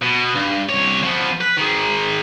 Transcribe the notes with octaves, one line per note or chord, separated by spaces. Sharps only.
B2
G2
C2 C#5
F3 B3
B4
D#3 G#3